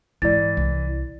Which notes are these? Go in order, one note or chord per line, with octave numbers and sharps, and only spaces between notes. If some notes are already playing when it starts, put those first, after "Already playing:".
G#2 E3 G#3 D5 A6
C2